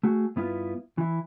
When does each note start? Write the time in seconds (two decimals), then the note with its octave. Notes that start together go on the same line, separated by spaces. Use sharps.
0.03 A3 F#4 G#4
0.36 G2 B3 E4 F4
0.98 E3 E4